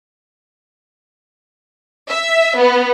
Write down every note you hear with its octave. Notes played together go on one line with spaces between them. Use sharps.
E5
B3